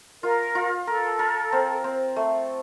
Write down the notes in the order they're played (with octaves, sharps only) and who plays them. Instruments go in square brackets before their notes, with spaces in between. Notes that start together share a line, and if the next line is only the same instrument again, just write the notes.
[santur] F4 [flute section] A#4
[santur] F4
[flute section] A4 [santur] A#4
[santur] A#4
C4
C4
A3